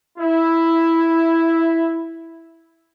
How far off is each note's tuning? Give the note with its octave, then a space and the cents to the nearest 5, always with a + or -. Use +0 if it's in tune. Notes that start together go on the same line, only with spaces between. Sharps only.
E4 +0